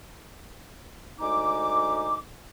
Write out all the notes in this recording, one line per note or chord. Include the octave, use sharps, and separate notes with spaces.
D2 G#3 D#4 D6